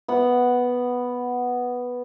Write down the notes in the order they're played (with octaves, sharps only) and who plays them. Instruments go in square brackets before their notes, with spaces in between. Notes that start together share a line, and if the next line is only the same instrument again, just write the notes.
[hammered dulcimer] B3 F#5